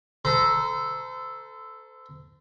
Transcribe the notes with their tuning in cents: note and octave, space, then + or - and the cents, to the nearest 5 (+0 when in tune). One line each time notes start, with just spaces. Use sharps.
A4 +0 C5 -35 A#5 +20